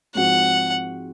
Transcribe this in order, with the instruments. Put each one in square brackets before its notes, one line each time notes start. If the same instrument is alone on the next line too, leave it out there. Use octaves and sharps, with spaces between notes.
[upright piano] G#2 F3 C4 F#4 [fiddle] F#5